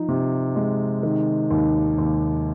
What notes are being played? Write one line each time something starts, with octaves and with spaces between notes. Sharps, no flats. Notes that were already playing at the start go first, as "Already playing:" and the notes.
Already playing: F3 D#4
C3
G#3
D#3
D#2
D#2